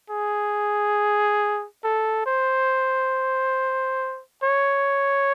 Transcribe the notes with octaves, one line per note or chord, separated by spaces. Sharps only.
G#4
A4
C5
C#5